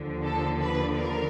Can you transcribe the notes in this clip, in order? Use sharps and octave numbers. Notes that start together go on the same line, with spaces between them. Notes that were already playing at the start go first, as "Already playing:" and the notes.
Already playing: D#2 D3 F3
A4
B4
A#4